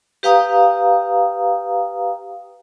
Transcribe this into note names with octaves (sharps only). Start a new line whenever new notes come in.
G4 B4 F5 G5 A#5 D#6